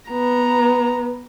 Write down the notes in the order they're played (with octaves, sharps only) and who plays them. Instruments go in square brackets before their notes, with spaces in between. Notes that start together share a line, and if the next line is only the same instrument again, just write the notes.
[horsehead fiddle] B3 [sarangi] A#5